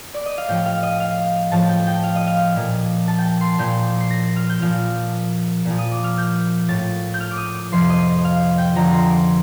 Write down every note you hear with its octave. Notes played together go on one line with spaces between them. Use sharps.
D5
D#5
F5
A2 F3 G5
F5
D#5
F5
A2 F3 A5
G5
G5
F5
D#5
F5
A#2 F3
A5
G5
A5
C6
A#2 F3 G6
C7
A#6
A#6
F6
G6
A#2 F3 F6
A#2 F3
D#6
D6
F6
G6
A2 F3 A6
G6
F6
D6
D#6
D6
F2 C3 F3 C6
D#5
F5
G5
F2 D3 F3 A#5
C6
D6